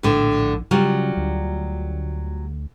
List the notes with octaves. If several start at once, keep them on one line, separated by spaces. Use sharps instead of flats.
A#1 A2 D3
C#3 F#3 G3 F4
D2